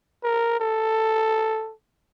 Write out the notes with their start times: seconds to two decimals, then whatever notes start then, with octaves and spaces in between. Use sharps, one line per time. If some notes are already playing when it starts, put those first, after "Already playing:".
0.23 A#4
0.60 A4